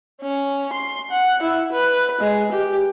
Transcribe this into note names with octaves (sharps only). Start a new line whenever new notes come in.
C#4
C6
F#5
E4
B4
G#3
G4